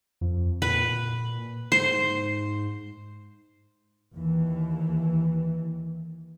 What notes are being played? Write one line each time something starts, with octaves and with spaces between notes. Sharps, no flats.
F2
A#2 B4
G#2 C5
D#2 E3